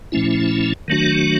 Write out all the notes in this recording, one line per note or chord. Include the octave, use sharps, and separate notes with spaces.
A#2 F3 A3 C#4 E4
D#3 F#3 A3 D4 F#4